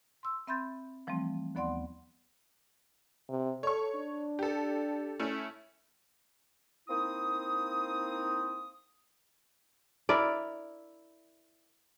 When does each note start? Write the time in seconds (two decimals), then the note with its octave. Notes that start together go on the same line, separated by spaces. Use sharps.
0.23 C6 E6
0.47 C4 E5 B5 C6 G6 A6
1.07 E3 F3 G3 A3 C4
1.55 D#2 F3 B3 D5 F#5 C6
3.30 C3
3.63 A4 C#5 C#6
3.96 D4
4.39 G4 A4
5.19 A3 C#4 E4
6.89 A#3 C4 D#4 E4 D#6
10.09 E4 A#4 D5